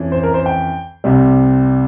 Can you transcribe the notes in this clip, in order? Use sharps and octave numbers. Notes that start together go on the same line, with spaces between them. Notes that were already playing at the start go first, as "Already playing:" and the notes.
Already playing: F2 E3 C#4
C5
A#4
C5
G5
C2 C3 G3